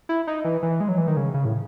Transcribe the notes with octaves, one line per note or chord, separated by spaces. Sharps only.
E4
D#4
E3
E3
G#3
F#3
E3
D#3
C#3
C#3
A2